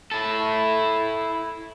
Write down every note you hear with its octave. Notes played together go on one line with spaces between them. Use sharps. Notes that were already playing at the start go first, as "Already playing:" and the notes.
E4 A4